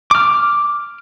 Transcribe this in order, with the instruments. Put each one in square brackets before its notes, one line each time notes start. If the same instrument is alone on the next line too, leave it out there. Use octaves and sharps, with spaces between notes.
[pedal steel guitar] D6 F6